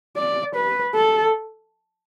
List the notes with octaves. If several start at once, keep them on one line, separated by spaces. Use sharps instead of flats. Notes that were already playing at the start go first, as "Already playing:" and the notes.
D5
B4
A4